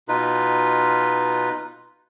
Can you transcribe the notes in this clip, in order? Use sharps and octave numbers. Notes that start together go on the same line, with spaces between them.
B2 D#4 F4 B4